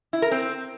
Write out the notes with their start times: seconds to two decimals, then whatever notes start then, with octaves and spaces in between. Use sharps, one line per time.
0.13 E4
0.22 A#4
0.31 C4